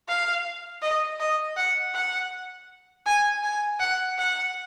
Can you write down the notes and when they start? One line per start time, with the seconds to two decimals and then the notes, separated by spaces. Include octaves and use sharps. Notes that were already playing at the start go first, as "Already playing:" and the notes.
0.08 F5
0.82 D#5
1.20 D#5
1.57 F#5
1.94 F#5
3.06 G#5
3.43 G#5
3.80 F#5
4.18 F#5